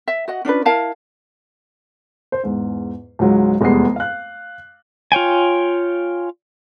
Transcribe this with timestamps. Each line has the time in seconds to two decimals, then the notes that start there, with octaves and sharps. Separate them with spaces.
0.08 E5
0.28 F#4 D#5 F#5
0.45 C#4 D4 F4 B4
0.65 E4 A#4 F5 A5
2.32 C5
2.44 E2 G#2
3.19 C#2 G#2 F#3 G#3
3.61 F1 E2 G3 G#3 B3 C7
3.96 F5 F#6
5.12 F4 C#5 G5 G#5